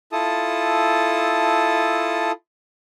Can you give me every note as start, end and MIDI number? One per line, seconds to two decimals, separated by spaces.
0.12 2.32 64
0.12 2.32 65
0.12 2.32 69
0.12 2.32 81
0.12 2.32 87